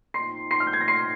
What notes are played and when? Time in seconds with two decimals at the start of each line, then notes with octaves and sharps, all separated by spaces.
0.14 A#2 F3 C4 D#4 C6 C7
0.51 C6 C7
0.60 F6
0.67 G6
0.73 G#6
0.81 A#6
0.88 C6 C7